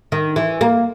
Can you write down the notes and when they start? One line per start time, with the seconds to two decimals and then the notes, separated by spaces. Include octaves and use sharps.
0.12 D#3
0.36 E3
0.61 A#3